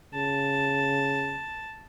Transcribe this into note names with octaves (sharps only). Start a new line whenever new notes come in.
C#3 A5